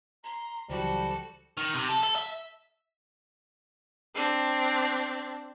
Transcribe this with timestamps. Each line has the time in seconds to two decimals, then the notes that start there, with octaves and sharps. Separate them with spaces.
0.24 A#5 C6
0.69 C#2 E3 F#3 G3 F#4 A4 C5
1.58 D#3
1.75 C3
1.89 A4
2.03 A4
2.15 E5
4.15 C4 D4